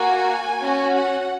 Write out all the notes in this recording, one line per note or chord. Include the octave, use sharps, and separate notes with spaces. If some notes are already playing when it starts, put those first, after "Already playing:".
Already playing: A#3 F#4 G#5
C#4 F#4
F#5